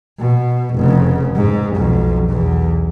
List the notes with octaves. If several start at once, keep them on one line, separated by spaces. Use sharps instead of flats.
B2
F1 C#3
G#2
B1 F2
B1 E2